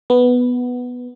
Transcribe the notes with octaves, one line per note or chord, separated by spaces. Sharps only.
B3